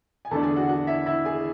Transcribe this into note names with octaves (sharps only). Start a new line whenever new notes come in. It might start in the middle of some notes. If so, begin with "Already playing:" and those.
G#5
E2 D3 A3 D4 A4 A5
G#4 G#5
F#4 F#5
F#4 F#5
E4 E5
E4 E5
G#4 G#5